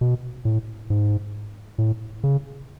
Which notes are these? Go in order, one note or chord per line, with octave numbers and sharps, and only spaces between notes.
B2
A2
G#2
A2
C#3